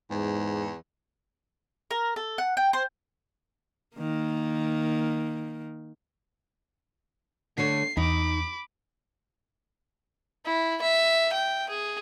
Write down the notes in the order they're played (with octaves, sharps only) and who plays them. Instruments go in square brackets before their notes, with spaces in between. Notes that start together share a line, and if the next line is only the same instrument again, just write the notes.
[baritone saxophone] E2 [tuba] G#2
[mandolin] A#4
A4
F#5
G5
C5
[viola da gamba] D#3 A#3
[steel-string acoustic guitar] D3 A3 C#5 [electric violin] C7
[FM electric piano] E2 [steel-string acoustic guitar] D#4 [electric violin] B5 D6
[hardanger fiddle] E4
E5
G5
G#4